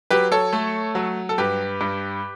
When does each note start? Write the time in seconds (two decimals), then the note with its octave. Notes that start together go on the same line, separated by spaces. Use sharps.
0.10 F#3 G4 B4
0.32 A4 C#5
0.53 A3
0.95 F#3
1.29 A4
1.38 G2 G4 B4
1.81 G2